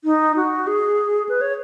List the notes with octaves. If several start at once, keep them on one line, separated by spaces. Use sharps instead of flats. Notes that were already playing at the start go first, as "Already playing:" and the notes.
D#4
F#4
G#4
B4
C#5